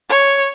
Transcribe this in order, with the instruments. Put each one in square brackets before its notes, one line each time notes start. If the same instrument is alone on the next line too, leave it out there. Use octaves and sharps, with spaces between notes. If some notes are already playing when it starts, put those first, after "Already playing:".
[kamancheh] C#5